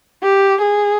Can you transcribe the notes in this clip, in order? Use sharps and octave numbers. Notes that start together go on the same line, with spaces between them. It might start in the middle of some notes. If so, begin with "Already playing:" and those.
G4
G#4